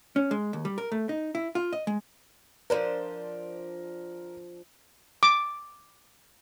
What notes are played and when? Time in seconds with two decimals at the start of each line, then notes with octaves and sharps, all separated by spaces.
0.16 C#4
0.31 G#3
0.53 D#2
0.65 G3
0.78 A#4
0.92 A3
1.09 D#4
1.35 E4
1.55 F4
1.73 D#5
1.87 G#3
2.70 F3 D4 A#4 C5
5.23 D6